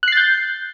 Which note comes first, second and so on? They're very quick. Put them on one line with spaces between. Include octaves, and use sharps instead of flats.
F#6 C7 A6 G6